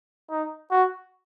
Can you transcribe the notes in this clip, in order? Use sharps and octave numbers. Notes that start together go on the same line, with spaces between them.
D#4
F#4